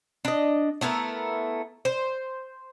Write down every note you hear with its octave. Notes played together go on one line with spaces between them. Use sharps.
D4 D#5
A3 B3 E4 A#4
C5